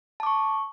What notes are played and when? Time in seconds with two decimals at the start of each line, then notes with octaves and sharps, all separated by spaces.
0.20 A5
0.23 D6
0.26 C#6